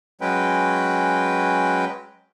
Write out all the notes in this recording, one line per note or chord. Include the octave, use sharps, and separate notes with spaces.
F#3 G#3 C#4 B4 G5